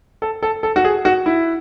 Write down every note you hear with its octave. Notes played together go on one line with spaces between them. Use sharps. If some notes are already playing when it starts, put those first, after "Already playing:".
A4
A4
A4
F#4
G#4
F#4
E4